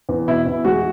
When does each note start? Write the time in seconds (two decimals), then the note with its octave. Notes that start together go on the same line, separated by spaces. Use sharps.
0.09 E2
0.28 B2 E4
0.46 E2
0.65 G#3 F#4